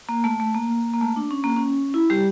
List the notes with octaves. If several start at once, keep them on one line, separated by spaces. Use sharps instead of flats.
A#3
A3
A3
A#3
A#3
A3
D4
C#4
A#3
C#4
E4
G3 G4